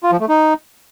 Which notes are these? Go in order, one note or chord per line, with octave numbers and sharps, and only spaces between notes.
F4
F3
A3
D#4